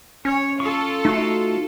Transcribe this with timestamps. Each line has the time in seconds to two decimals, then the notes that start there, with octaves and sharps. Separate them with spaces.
0.25 C#4 C#5
0.60 F4 A4 C#6
1.05 A3 D#4 F#4